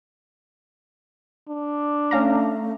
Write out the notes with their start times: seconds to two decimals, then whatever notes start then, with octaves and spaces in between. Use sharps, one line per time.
1.49 D4
2.11 A3 C#4 F5 A#5